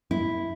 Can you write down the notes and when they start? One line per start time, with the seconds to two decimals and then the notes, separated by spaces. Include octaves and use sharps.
0.11 E4